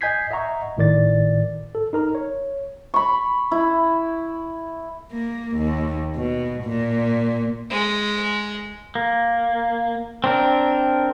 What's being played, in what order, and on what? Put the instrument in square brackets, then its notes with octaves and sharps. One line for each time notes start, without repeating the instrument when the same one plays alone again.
[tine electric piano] D#5 G#5 G6 G#6 B6 C7
D#5 E5 F#5 A#5 C#6
G#1 A2 D#3 D5 A6
A4
D#4 A#4 A#5
C#5
[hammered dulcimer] B5 C#6
E4
[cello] A#3
D#2
B2
A#2
[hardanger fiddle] G#3
[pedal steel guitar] A#3
C4 D4 A#4